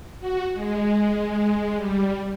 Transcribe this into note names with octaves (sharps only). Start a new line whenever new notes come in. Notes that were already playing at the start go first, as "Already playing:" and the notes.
F#4
G#3
G3